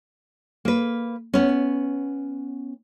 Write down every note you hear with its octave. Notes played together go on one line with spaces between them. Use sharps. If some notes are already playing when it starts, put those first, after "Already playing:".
A#3 B4
B3 C#4